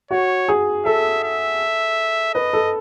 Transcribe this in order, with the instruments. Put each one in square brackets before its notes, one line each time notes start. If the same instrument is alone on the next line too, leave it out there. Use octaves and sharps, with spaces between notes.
[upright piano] F#4 [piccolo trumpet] C#5
[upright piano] G#4
[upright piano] A4 [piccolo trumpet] E5
[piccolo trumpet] E5
[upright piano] B4 [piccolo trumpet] D#5
[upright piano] A4